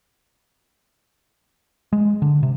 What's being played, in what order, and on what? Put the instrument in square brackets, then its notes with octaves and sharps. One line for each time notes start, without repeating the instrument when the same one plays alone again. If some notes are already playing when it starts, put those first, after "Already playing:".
[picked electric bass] G#3
D3
C3